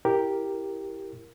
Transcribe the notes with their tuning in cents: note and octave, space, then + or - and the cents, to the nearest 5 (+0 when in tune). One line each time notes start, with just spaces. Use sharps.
E4 +0 G4 +0 A#4 +0